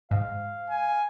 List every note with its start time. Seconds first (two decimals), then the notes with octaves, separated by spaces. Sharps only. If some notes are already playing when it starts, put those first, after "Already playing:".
0.11 G#2 F5
0.69 G#5